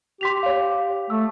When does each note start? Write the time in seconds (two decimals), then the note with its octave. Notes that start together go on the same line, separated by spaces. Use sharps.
0.21 G4 C6 B6 F7
0.43 C#5 F5
1.10 A3 E6